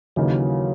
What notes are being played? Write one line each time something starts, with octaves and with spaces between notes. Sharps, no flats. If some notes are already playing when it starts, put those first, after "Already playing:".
D#2 C#3 E3 F#3 A#3 D#4